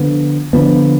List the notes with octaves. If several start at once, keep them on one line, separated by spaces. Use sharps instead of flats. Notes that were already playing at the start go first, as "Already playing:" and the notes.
Already playing: D3 F3 B3
D3 F3 B3